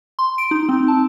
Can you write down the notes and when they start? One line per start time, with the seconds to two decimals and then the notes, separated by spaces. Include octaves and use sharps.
0.19 C6
0.38 D7
0.51 D#4
0.69 C4
0.88 A5